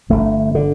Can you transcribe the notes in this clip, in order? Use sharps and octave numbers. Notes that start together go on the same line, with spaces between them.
G1 F2 D3 A3
D3